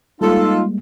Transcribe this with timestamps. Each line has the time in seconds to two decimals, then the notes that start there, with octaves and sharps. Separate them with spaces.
0.21 G3 G#3 A#3 D#4 F4 A4